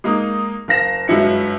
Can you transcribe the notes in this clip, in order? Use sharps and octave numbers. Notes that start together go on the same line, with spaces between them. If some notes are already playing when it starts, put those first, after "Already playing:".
G#3 A#3 D#4
F#1 F5 A#6 E7
G1 F#2 G#3 E4 C#7